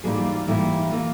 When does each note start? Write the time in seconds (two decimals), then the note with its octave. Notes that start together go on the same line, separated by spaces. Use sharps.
0.04 G#2 E3 G3 A#3 G#4
0.18 F4
0.32 F4
0.47 G#2 E3 G3 A#3 E4
0.90 E3 A#3 F4